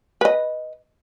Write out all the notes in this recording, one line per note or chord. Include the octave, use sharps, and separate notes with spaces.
B4 D#5